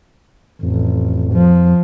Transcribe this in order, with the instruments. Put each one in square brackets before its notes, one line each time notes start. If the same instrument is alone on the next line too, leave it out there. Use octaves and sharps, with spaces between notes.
[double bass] A1 [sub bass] F2
[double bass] F3